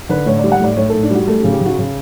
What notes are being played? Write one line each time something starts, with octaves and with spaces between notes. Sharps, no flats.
D3 B4
A2 C#5
G3 D5
F#5
A2 D5
A2 C#5
A2 A4
D4
G3 F#4
A3 A4
G4
C#3
G4
C#3 F#4
C#3